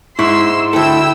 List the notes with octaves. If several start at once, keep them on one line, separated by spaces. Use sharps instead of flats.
G#2 E4 C6 C#6 E6
D2 A3 E4 G5 E6